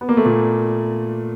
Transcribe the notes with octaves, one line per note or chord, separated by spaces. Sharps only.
B3
A#3
A3
A#2 A#3